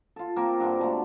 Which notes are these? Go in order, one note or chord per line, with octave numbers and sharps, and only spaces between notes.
F4 A4
A#3 C4 A#4 C5
G2 D3
B2 D3 A3